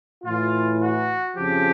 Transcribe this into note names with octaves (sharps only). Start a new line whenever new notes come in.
A2 E3 F4
F#4
F2 C#3 F3 G4